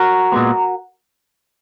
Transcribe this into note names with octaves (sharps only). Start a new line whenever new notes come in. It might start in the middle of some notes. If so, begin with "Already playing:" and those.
Already playing: F#4 A#4
A#2 G#3 B3